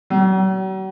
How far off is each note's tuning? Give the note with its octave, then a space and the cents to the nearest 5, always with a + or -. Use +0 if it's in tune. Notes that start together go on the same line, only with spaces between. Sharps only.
F#3 +45